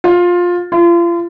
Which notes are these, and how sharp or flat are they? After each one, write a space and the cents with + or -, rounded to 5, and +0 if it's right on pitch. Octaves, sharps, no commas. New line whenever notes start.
F4 +15
F4 -35